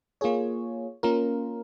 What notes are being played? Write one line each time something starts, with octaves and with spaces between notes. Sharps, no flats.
A#3 F4 G#4 C#5
A#3 C#4 F4 A#4